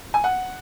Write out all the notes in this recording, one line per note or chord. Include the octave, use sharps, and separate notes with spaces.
G#5
F#5